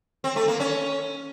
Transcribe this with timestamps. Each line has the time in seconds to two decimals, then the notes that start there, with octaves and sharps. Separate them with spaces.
0.24 C4
0.36 A3
0.48 A#3
0.60 C#4